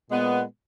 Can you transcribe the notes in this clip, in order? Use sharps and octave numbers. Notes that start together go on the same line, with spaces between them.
A#2 G#3 B3